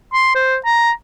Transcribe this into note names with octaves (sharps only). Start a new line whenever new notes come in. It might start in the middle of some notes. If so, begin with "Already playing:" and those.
C6
C5
A#5